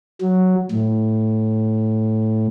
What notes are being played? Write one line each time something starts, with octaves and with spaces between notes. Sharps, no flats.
F#3
A2